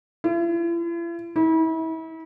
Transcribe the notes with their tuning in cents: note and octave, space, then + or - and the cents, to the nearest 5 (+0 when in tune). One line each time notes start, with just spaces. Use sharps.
E4 +45
E4 -35